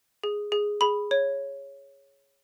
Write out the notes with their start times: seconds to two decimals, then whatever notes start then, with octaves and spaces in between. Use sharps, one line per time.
0.24 G#4
0.52 G#4
0.81 G#4 B5
1.11 C#5